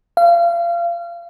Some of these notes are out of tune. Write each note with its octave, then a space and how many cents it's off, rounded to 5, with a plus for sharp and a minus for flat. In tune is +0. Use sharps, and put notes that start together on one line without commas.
F5 -30